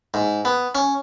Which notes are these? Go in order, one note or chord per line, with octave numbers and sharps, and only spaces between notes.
G#2
B3
C#4